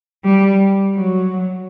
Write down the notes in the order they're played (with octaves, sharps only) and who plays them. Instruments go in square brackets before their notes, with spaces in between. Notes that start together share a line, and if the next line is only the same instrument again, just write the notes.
[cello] G3
F#3